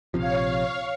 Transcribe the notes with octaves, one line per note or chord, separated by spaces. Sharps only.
A#1 C3 F3 C#5 F5